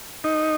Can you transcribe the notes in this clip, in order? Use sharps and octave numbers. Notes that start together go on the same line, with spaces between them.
D#4